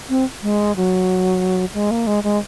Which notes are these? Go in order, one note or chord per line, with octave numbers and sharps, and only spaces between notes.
C4
G#3
F#3
G#3
A#3
G#3
G#3